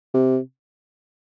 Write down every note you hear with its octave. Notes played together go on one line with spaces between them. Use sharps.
C3